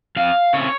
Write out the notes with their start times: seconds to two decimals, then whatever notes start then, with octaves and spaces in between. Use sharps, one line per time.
0.16 F2 F5
0.53 C#3 A3 C4 C#5